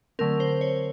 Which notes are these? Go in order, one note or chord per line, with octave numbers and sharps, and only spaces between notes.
D3 F#3 A3 C4 A#4
C5
C#5